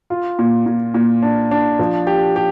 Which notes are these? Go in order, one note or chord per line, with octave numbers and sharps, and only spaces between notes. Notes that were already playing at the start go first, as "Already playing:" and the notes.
F4
A#2
A#2
A#2
D4
D4
F3
G4
G4